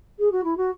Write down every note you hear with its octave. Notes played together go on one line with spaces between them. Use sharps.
G#4
F#4
E4
F#4